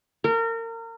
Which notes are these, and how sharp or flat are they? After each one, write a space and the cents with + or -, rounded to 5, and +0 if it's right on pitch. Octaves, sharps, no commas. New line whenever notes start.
A#4 -30